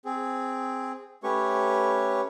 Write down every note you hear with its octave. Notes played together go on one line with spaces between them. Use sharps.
C4 G#4
A3 C#4 G4 B4 C#5 C#6